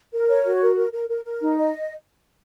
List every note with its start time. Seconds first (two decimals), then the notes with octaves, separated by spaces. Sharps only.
0.13 A#4
0.29 C#5
0.45 F#4
0.61 A#4
0.76 A#4
0.92 A#4
1.09 A#4
1.24 A#4
1.41 D#4
1.57 D#5